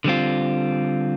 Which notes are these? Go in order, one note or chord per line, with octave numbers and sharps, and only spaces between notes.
D3 G3 C4 F4